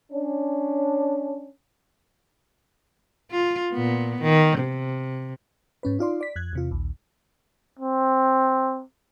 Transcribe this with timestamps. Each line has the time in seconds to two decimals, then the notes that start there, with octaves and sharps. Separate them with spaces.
0.12 C#4 D4
3.31 F4
3.72 A#2 B3
4.22 D#3
4.59 C3
5.83 G#2 C#4 B4
5.99 D#4 F4 D5 C6
6.21 D5 B6
6.36 F2 F#6 G#6
6.53 E2 C3 F4
6.71 A#1 D#2
7.80 C4